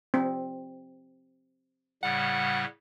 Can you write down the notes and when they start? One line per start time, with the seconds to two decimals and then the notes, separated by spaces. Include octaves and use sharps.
0.14 C4
2.03 A2 C#3 G3 F#5